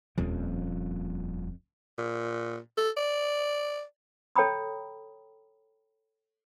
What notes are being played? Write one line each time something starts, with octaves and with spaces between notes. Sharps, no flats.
D#1 F2 F3 G3 A#3 C#4
A#2
A4
D5
A4 C#5 G5 A#5 B5 D#6